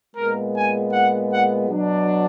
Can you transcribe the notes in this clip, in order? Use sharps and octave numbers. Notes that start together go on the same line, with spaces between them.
A#2 G#3 B3 A#4
G#5
F#5
F#5
B2 F#3 D4